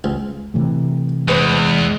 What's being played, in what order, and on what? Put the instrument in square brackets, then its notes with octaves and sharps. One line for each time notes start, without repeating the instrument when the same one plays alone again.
[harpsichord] C#2
[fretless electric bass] C3 E3 A3
[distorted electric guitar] E2 [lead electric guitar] G#3 [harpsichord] B4 C5